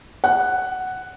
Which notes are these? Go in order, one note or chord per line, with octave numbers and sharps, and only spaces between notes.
F#5